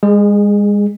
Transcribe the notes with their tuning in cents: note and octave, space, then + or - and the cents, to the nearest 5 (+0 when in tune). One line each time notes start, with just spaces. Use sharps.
G#3 -30 G#4 +0